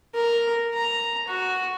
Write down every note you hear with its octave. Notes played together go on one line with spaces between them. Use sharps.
A#4
A#5
F#4